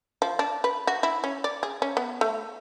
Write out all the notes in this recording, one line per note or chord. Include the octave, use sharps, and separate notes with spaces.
F3
D4
B4
F#4
E4
C#4
D5
G#4
C#4
B3
A3